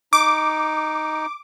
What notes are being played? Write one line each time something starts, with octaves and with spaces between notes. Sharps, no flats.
D#4 D6